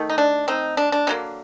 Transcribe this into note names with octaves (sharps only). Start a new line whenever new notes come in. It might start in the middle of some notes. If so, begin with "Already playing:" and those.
Already playing: D#3 A3
D#4
D4
C4 D#4
D4
D4
D3 F#3 A#3 C4